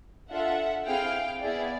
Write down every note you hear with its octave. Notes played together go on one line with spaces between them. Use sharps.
D4 F4 A4 E5 F#5
C4 E4 G#4 F5 G5
B3 E4 G#4 D5